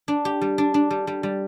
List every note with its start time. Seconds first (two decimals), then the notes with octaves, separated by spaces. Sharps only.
0.08 D4
0.25 G4
0.41 G3
0.58 D4
0.74 D4
0.91 G3
1.07 G3
1.23 G3